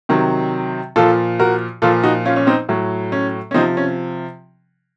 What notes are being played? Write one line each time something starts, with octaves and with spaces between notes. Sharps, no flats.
C3 D#3 F#3
A#2 F3 F4 A4
F#4 A#4
A#2 F3 F4 A4
D#4 F#4
C#4 F4
C#4
C4 D#4
A2 F#3
C#4
C#4
C3 F3 C4 D#4
C#4